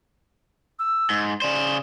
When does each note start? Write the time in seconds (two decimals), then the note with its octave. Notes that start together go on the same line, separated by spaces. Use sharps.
0.79 E6
1.10 G#2
1.42 C#3 C5 D5